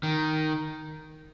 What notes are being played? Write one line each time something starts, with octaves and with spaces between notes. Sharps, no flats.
D#3